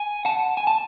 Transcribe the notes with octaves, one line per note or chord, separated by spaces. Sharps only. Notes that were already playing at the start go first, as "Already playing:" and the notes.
Already playing: G#5
F#5 A5
G#5
A5